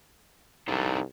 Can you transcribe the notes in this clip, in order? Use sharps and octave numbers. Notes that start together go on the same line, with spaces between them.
C2 D4 D#4 A4